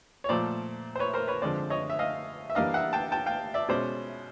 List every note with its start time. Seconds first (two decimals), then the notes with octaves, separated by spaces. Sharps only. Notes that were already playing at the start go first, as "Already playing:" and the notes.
0.24 C#5
0.29 A#2 F3 A3 C5 D5
0.95 C5
0.99 B4 C#5
1.13 A#4 C5
1.28 B4 C#5
1.42 D3 F3 G#3 C4 C5 D5
1.70 C#5 D#5
1.90 E5
1.99 D#5 F5
2.50 E5
2.55 E3 G3 A#3 D4 D#5 F5
2.74 E5 F#5
2.93 G5 A5
3.12 G5 A5
3.26 F5 G5
3.54 D5 E5
3.68 B2 G#3 C#4 C5 D5